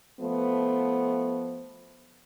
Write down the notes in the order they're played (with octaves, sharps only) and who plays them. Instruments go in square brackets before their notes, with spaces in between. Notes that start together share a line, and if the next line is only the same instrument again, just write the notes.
[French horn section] F3 A3 B3